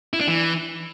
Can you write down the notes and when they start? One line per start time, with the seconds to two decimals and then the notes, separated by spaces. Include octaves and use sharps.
0.13 E4
0.21 D4
0.28 E3